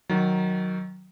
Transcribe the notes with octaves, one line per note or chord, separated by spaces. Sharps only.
D#3 F#3